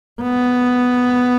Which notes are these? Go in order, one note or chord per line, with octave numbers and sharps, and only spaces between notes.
B3